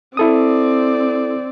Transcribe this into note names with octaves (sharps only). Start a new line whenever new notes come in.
C4 E4 A4 D5 D#6